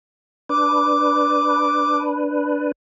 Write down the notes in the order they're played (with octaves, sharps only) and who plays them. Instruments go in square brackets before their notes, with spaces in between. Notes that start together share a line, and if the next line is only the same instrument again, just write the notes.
[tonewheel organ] D4 B4 [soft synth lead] D6